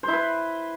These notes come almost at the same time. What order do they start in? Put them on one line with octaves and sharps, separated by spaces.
C5 E4 B4